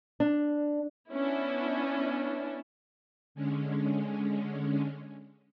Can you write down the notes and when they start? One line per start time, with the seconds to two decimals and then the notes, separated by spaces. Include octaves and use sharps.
0.20 D4
1.12 B3 C#4 D4 E4
3.35 D3 G#3 C#4